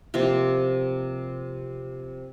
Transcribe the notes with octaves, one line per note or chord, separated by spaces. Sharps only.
C3 F3 A#3 C4